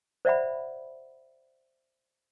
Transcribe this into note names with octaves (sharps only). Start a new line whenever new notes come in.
C5 D5 E5 F#5 B5